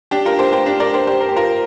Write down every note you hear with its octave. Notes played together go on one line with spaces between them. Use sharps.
D4 G4
F4 A#4
G4 C5
G4 C5
D4 G4
A#4 D5
G4 C5
G4 C5
A#4
G4
F4 A#4